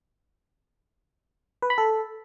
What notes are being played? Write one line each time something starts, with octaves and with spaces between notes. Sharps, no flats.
B4
B5
A4